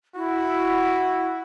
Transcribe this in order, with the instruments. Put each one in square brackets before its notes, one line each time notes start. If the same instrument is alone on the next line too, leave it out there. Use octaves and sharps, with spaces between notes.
[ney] E4 [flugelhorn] F#4